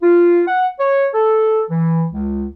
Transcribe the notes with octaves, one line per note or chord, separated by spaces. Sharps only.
F4
F#5
C#5
A4
E3
C#2